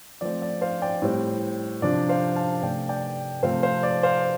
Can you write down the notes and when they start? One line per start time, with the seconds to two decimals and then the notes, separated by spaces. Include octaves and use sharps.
0.21 F3 A3 C4 D5
0.42 D5
0.61 C5 F5
0.82 D5 G5
1.02 A2 G3 C4
1.82 C3 F3 D4 D5
2.09 C5 F5
2.35 F5 A5
2.62 C3 A3 D4 D5 G5
2.89 D5 G5
3.43 C3 F3 A3 C4 C5 F5
3.63 C5 F5
3.83 D5
4.03 C5 F5